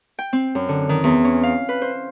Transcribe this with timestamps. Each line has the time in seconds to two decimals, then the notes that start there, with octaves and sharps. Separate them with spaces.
0.19 G5
0.33 C4
0.55 F#2
0.69 D3
0.89 D#3
1.04 E2
1.24 C#4
1.43 F5
1.69 B4
1.82 C5